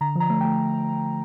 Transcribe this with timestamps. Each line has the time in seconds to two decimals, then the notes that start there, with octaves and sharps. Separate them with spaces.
0.01 D3 A#5
0.15 F3 A#5
0.30 A3
0.41 G5
0.45 A3